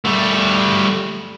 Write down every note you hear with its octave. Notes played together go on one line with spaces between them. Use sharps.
G3 A3